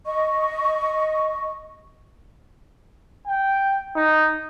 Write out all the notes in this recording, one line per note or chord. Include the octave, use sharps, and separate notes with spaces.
D#5 C#6
G5
D#4